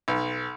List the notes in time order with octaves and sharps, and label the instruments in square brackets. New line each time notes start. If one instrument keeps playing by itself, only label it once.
[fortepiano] B1